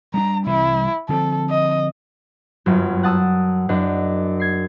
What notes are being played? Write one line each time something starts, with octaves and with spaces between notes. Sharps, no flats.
G3 G#3 D4 A#5
C2 E3 G3 E4
D3 F3 C4 A4
D#5
G1 F#2 F#3
F#5 A5 D#6 E6
F#1 F#2 D4 D#5
G#6 C7